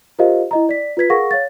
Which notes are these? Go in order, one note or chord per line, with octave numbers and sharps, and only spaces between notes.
F4 G4 A#4 C5 D#5 F5
E4 D#5 A#5
D5 B6
F4 B4 G#6 B6
G#4 A#4 F5 F#5 C#6 A#6
C#5 F5 A6